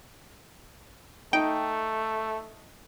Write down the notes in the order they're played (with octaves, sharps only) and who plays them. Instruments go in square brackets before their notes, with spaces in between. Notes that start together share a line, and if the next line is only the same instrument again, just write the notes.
[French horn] A3 [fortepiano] D#4 [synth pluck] G5